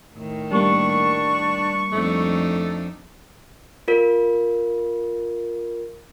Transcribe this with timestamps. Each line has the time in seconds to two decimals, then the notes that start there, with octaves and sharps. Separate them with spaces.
0.15 A2 D#3
0.52 G3 A#3 D4 C#6
1.93 F2 A3 D4 D#4
3.88 F4 A#4